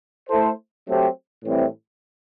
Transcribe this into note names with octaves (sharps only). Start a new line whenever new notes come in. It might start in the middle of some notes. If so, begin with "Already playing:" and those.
A3 E4 A4 C5
F#3 A3 C4 G4
A2 E3 G3 C4 E4